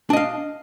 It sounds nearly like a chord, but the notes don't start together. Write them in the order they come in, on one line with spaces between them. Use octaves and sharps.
D4 D#5 F5